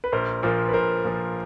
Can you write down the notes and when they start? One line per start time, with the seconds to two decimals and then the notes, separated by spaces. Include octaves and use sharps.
0.04 B4
0.12 A#1 A#4 C5
0.43 A#2 F3 A#4 C5
0.69 B4
0.73 A#1 A#4 C5
1.04 A#2 F3